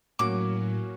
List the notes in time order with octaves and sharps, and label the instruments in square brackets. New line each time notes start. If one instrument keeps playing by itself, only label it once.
[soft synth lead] A2 [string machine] F#3 [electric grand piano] A#3 C#4 F#4 [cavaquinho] D6